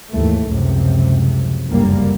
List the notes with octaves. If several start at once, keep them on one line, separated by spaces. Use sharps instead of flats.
D#2 G#2 E3 A3
C#2 F#2 A2 C3 F3
F1 C#2 F#2 D3 G3 A#3